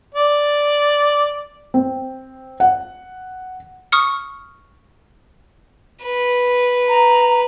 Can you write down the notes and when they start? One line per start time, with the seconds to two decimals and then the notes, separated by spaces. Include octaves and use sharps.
0.14 D5
1.74 C4
2.60 F#5
3.92 C#6 D#6 F6 C#7
6.03 B4
6.89 A#5